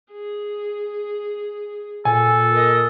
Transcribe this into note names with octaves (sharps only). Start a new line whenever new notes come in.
G#4
A#2 A4 G#5
A#4 D#5